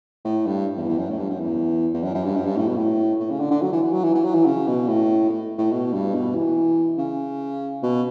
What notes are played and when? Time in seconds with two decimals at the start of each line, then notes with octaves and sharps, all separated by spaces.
0.24 A2
0.47 G2
0.77 E2
0.88 E2
0.98 F#2
1.10 A2
1.19 G2
1.30 F#2
1.40 E2
1.94 E2
2.03 F#2
2.14 F#2
2.24 G2
2.36 F#2
2.45 G2
2.57 A2
2.67 B2
2.77 A2
3.20 A2
3.30 C#3
3.40 D3
3.51 D3
3.62 F#3
3.72 E3
3.83 E3
3.92 F#3
4.04 E3
4.15 E3
4.25 F#3
4.35 E3
4.46 C#3
4.67 B2
4.88 A2
5.29 A2
5.58 A2
5.72 B2
5.93 G2
6.14 B2
6.34 E3
6.98 C#3
7.83 B2